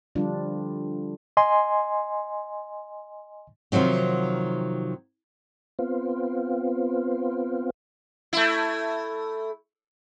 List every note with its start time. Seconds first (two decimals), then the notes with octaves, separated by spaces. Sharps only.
0.15 D3 F3 G3 D4 F4
1.37 D#5 G#5 C6
3.72 C3 D#3 F3 F#3 C4
5.79 B3 C4 F4
8.33 A3 E4